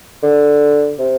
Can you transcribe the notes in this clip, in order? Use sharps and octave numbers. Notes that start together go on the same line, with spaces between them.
D3
C3